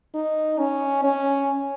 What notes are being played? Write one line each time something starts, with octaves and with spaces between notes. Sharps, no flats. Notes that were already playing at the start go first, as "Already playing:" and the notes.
D#4
C#4
C#4